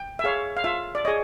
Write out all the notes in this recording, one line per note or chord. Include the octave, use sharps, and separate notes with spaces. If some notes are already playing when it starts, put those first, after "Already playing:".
Already playing: G5
E5
G#4 C#5 F5
F5
F4 E5
D5
G#4 C#5 D#5